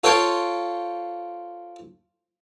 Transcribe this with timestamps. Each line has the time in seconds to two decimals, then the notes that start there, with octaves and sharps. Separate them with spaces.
0.04 F4 A4 C5 C#5 G5